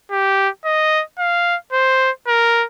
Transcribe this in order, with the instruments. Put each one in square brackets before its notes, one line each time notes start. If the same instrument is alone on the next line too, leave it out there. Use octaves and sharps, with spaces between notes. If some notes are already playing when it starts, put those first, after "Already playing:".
[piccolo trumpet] G4
D#5
F5
C5
A#4